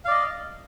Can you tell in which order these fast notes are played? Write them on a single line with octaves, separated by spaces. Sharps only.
F5 D5 D#5